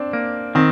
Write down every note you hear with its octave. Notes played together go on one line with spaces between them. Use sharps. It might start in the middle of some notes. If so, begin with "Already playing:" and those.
Already playing: C4 D4
A#3
D#3 C4